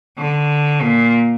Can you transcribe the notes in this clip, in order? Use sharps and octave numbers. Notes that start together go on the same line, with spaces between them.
D3
A#2